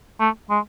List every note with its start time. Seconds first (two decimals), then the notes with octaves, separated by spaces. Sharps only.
0.20 A3
0.50 G#3